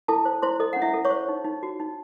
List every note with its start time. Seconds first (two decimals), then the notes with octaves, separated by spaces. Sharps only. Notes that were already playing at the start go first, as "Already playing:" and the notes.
0.08 E4 A4 A5
0.25 C5
0.42 E4 C5 C6
0.60 A4 D#5
0.73 C#4 F#5
0.82 E4 E5
0.94 A4
1.05 C#5 C#6
1.10 C5
1.29 D#4
1.44 D#4
1.63 F#4
1.80 D#4